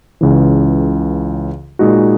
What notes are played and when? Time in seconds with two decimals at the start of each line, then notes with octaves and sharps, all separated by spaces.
0.21 C#2 C#3 E3
1.79 A#2 G#3 D#4 F#4